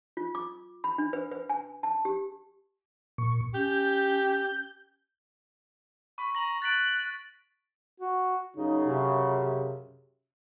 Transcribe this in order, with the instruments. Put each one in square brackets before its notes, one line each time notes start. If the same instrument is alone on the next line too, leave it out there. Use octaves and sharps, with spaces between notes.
[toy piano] F4
D6
B5
D4
B4
B4
G#5
A5
G4
[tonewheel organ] A#2 C#6
[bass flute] C#4 [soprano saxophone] G4 [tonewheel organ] G6
[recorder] B5 [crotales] C#6
[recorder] A#5 [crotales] A#6 F#7
[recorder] F#6 [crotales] A6 B6 D7
[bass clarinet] F#4
[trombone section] F#2 C#3 [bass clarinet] D#4
[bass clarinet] C3